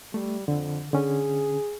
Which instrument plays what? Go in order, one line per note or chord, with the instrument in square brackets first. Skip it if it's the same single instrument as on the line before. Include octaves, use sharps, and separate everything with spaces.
[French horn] G3 [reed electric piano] A3
[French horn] F2 [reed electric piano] D3
[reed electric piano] D3 C#4 [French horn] G#4